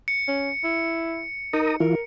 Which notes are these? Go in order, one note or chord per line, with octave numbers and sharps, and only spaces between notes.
C#7
C#4
E4
D#4 A#4 A#5 D#6
E3 E4 F4 A#4